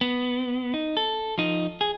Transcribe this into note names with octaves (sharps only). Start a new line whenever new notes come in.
B3
D#4
A4
F3 D#4
G#4